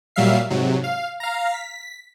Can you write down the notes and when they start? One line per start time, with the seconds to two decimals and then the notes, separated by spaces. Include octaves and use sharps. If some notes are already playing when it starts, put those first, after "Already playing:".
0.16 A#2 F#3 G3 E5 F5 C7
0.50 G#2 C3 F#3
0.84 F5
1.20 F5 A#5
1.54 B6